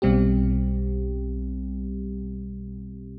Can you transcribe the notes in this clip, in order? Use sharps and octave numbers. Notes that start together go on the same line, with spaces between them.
B1 B2 G3 C4 G4